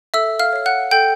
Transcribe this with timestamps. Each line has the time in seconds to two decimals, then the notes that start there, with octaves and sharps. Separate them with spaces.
0.14 A4 E5 E6
0.39 F5 F6
0.53 C#5 F5
0.66 F#5 F#6
0.91 A4 G5 G6